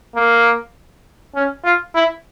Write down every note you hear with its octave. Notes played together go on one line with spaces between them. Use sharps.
A#3
C#4
F4
E4